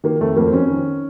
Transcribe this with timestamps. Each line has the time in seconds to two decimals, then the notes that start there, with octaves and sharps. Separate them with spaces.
0.04 D#3 A#3
0.21 F2 A3
0.36 F2 A#3
0.47 C4
0.53 F2 C#4
0.69 D#3